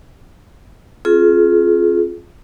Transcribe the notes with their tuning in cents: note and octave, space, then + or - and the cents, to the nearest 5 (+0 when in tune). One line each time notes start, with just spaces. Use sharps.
C4 +45 F4 +0 G#4 +30